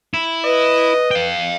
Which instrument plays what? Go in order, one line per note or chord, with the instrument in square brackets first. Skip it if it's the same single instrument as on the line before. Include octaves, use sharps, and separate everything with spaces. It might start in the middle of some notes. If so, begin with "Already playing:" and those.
[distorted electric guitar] E4
[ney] B4 [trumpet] D#5
[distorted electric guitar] F5 G5